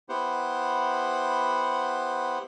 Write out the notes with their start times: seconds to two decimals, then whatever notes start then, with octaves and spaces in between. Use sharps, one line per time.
0.09 B3 E4 G4 C5 F#5